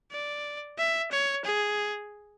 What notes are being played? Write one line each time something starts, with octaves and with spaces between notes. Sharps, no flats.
D5
E5
C#5
G#4